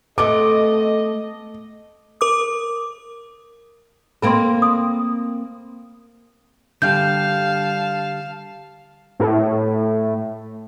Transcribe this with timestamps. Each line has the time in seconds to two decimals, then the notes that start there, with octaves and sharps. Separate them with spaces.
0.18 A3 B3 C4 A4 D#5 D6
2.21 A#4 D6 D#6
4.22 A#3 C4 A4 B5 C6
4.62 C6 D#6
6.82 D3 G3 F5 A5 G6
9.20 A2